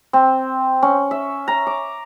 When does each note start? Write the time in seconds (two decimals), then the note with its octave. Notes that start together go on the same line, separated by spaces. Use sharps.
0.13 C4
0.83 C#4
1.11 E5
1.48 A#5
1.67 D6